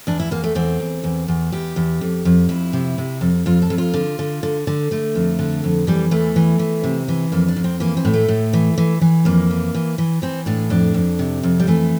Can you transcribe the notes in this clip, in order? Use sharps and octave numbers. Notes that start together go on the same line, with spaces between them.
E2 D4
E4
E2 A#3
A3
E2 C4
E2
E2
E2
E2 G4
E2
F2
F2
F2 E4
C3
C3
F2
F2 F4
A4
F2
F4
D3
D3
D3
D3
D3 A3
F2
D3
F2
E3 G3
E2 A3
E3
E3
C3
E3
F2 A#3
D4
F2
C4
E3 A#3
C4
A2
A3
A2
E3
E3
E3
F2 A#3
E3
E3
E3
E3 C4
A2 D4
F2 D4
F2
C3
F2
G3
E3 A3